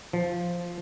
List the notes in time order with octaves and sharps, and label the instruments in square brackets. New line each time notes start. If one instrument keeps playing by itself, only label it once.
[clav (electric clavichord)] F3